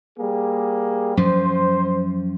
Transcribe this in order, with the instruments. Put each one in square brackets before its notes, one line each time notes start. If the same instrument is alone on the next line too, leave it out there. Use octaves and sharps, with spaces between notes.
[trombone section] G3 A#3 G#4
[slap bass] F#2 F3 [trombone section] C5